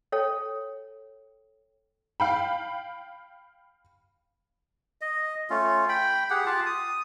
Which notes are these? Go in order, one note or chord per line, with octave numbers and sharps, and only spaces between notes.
A4 C#5 G5
F5 G5 B5
D#5
A3 C#4 F4
G5 B5
G4 G#4 F#5
F4 G4 F5 A5
D#6